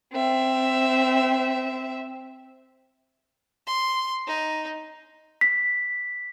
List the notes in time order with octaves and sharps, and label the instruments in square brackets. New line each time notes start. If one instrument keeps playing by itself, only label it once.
[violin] C4 E5
[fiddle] C6
D#4
[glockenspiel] B6